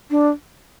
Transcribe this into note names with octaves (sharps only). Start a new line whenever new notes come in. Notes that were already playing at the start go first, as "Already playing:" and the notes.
D4